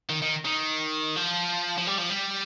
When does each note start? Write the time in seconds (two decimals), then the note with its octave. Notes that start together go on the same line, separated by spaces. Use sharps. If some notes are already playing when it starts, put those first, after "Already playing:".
0.09 D#3
0.22 D#3
0.45 D#3
1.16 F3
1.78 F3
1.87 G3
1.98 F3
2.10 G3